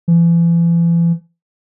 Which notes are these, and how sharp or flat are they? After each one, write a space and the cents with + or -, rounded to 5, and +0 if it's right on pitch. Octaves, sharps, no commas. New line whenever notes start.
E3 +40